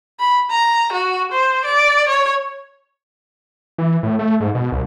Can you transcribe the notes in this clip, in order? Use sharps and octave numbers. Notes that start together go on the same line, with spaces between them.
B5
A#5
F#4
C5
D5
C#5
E3
A2
A3
G#2
B2
C2